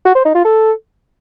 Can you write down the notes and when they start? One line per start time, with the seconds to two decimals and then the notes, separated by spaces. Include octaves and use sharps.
0.05 F#4
0.15 C5
0.25 D#4
0.35 F4
0.45 A4